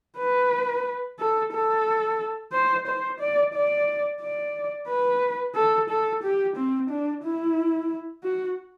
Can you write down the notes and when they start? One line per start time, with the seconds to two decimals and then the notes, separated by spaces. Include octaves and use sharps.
0.18 B4
1.19 A4
1.53 A4
2.53 C5
2.87 C5
3.20 D5
3.55 D5
4.22 D5
4.88 B4
5.55 A4
5.90 A4
6.23 G4
6.56 C4
6.90 D4
7.24 E4
8.24 F#4